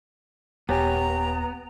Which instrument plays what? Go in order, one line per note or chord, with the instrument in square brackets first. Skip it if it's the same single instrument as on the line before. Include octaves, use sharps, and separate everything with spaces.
[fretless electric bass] D#1 [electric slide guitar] B3 [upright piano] G4 C#5 G#5 [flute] A#5